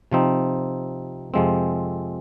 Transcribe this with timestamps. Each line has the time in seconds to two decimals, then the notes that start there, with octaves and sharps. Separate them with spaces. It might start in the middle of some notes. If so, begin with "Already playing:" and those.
0.12 C3 F3 C4 D#4
1.34 F2 C3 F3 G#3 C4